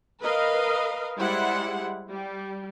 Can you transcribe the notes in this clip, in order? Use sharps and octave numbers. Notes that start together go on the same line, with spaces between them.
A#4 B4 D#5 F5
G3 G#3 E4 C5 F#5
G3